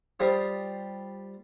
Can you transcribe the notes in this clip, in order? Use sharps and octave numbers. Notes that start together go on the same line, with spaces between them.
G3 F4 C5 D#6